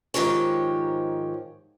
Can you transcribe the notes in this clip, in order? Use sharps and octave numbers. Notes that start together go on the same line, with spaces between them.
G#2 C3 D#3 F3 G4 C#5